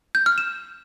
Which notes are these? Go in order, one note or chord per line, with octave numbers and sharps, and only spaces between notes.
G6
F6
E7